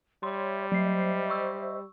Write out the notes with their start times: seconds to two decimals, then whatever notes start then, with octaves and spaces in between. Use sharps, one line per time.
0.23 G3 C#5 E5 C6
0.72 F#3 C5 D#5 E5 C7
1.30 C#6 E6